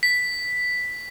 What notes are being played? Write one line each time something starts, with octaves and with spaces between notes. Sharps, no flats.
B6